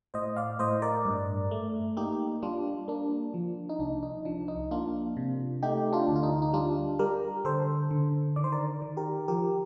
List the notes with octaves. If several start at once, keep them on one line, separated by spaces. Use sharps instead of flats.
A2 C5 D#5
D5 F5
A2 C5 D#5
A#4 D5
G2
A3
A#3 D#4 G4
G3 D4 F4
A#3 D4
F3
D#4
C2 D4
D#4
F3 D4
D#4
A#3 D4 F4
C3
A3 D#4 G4
D4 F4
D2
F4
D#4
D#4
G3 D4 F4
G3 G4 A#4
D3 A4 C5
D3
D#3 D5
C5
A#4 D5
D#3
G4 A#4
F3 G4 A#4